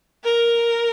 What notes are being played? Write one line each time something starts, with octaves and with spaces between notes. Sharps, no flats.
A#4